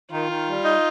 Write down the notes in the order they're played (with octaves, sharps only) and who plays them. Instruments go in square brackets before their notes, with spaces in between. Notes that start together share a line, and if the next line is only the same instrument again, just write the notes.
[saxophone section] D#3 [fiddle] F4
[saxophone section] D#3
G3
D#4